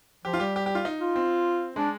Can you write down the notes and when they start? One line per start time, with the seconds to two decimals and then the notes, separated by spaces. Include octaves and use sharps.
0.25 F3 G4
0.33 F4
0.40 G3 G4
0.56 G4
0.66 G4
0.75 F4
0.85 D#4
1.01 F4
1.16 C4
1.76 G#3 D4